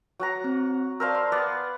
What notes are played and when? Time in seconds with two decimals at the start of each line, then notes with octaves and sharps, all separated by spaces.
0.20 F#3 F#5 A#5
0.44 C4
1.00 A#4 C5 D5 F5 A5 E6
1.15 C6
1.32 B3 D5